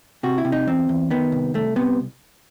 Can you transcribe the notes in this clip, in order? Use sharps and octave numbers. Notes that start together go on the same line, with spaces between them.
C3 F#4
E4
C3
D#4
E2 C4
E2
D#3 B3
C2
C2 A3
C3 B3